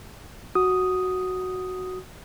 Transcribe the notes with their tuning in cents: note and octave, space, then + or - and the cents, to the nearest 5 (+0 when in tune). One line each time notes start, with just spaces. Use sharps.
F#4 +0 D#6 +0